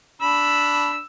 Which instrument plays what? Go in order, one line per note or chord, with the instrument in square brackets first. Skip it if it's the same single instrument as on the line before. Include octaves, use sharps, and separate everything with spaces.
[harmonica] D4 B5 [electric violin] E6